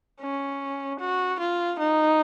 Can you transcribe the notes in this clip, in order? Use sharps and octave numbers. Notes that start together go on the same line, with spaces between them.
C#4
F#4
F4
D#4